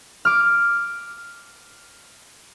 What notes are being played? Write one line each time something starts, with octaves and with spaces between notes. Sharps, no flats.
D6 F6